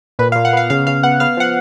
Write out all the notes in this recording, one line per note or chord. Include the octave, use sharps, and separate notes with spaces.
A#2 B4
A#2 F5
F#5
B3 F5
C#3 F5
C#3 F5
B3 F#5
B3 F5
F3 F#5